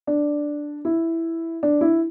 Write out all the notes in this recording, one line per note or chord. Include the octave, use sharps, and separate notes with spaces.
D4
E4
D4
E4